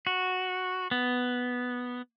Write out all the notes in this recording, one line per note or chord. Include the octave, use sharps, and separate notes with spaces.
F#4
B3